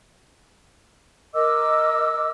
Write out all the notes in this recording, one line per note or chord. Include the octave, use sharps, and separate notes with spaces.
A#4 D#5 D6 E6